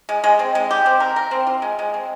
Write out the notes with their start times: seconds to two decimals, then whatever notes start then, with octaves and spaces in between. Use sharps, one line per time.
0.09 G#3
0.24 G#3
0.39 C4
0.55 G#3
0.71 G4
0.86 C4
1.00 A#4
1.16 A#4
1.31 C4
1.47 F4
1.62 G#3
1.79 G#3
1.94 C4